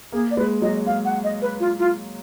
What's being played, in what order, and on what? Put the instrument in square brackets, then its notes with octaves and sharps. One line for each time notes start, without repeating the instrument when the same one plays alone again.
[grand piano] A#3 [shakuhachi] G#4
[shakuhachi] D5
[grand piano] G#3 [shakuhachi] B4
[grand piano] F#3 [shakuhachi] D#5
[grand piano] G#3 [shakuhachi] F5
[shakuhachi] F#5
D#5
B4
F4
F4